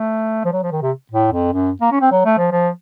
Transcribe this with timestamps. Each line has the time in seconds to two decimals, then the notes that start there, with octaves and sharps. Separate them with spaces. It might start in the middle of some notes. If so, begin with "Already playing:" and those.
Already playing: A3
0.45 F3
0.52 F#3
0.63 F3
0.72 D#3
0.82 C3
1.12 A2
1.32 F2
1.52 F#2
1.81 A#3
1.92 C#4
2.01 C4
2.11 F#3
2.25 A3
2.38 F3
2.52 F3